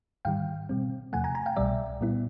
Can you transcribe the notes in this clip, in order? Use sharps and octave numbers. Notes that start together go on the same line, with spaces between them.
G#2 D#3 G3 F5 G5
B2 G3 C4
E2 C3 F3 A3 F#5 G#5
G#5 A#5
G#5 A#5
F5 G5
C2 B2 G3 D5 E5
A#2 G3 B3 E4